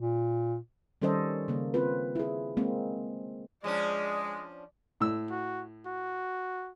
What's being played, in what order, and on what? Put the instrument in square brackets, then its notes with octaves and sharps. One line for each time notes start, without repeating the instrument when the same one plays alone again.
[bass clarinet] A#2
[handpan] D#3 G3 C#4 A4 C5 D#5
C#3 A#3
C4 F4 B4
E4 G#4
G#3 A#3 C4
[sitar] F3 C#4 D4 [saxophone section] G#3 [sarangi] D5
[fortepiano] A2 E6
[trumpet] F#4
F#4